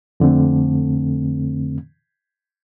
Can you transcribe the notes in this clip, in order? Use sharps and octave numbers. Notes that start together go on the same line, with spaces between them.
F2 D3 A3 C4